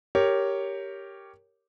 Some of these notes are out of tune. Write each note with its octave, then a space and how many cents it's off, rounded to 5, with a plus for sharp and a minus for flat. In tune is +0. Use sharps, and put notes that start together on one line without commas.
G4 +0 A#4 -10 C#5 +5